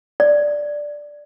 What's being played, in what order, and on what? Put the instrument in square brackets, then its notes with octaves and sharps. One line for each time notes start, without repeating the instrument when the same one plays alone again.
[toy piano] D5